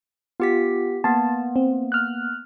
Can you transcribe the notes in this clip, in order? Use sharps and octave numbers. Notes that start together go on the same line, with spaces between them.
B3 F4 G4 B6
A#3 B3 A5
C4
F6 F#6